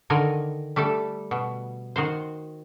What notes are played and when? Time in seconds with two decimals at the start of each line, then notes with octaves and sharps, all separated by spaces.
0.10 D3 D#3 A#4 G#5
0.76 G3 A3 D4 A4
1.31 B2
1.96 D#3 F#4 C5